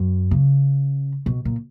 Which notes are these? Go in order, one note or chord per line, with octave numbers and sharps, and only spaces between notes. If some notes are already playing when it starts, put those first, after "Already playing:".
Already playing: F#2
C#3
B2
A#2